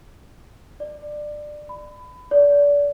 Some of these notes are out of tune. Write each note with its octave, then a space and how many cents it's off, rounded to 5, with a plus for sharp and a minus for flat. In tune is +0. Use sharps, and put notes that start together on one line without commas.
D5 +20
B5 +25
D5 -30